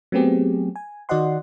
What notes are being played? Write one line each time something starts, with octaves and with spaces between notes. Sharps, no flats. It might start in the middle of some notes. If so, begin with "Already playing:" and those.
F#3 A3 B3 C4 G4 G#4
G#5
D#3 F#4 D5 D#5 F#5 C6